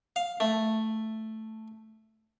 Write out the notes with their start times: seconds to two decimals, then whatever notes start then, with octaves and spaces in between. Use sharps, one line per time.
0.16 F5
0.40 A3